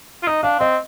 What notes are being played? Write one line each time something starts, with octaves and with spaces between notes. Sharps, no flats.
F4
D#4 D#5
D4 F5
C4 D#5